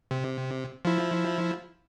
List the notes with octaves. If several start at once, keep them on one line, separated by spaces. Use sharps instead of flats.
C3
F3 E4